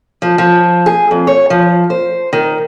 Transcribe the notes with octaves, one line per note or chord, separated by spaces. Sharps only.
F3
F3
G#4
F2
C#5
F3
C5
D#3